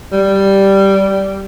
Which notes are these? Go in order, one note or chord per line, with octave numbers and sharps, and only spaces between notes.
G3